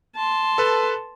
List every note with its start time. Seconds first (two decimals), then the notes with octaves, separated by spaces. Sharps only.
0.16 A5 C6
0.58 A4 B4